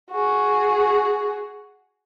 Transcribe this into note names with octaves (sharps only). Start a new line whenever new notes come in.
F#4 G#4